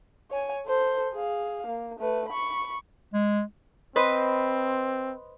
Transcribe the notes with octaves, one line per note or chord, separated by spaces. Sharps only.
C#5 G#5
A4 C5
G#4 F5
A#3
A3 B4
B5 C#6
G#3
C4 B4 C5 D#5